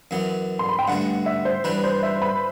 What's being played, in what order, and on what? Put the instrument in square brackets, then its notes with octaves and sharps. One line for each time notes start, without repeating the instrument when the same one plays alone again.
[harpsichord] F#2 E3 B3
[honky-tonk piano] C6
B5
G5
[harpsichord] G2 D3 A3 [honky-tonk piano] F#5
[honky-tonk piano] E5
C5
[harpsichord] E3 G3 D4 [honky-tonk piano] B4
[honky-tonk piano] C5
E5
B5